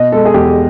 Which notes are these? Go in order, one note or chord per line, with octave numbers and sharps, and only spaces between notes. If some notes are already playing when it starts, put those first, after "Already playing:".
Already playing: B2 D#5
G#3 A4
G#4
E2 G4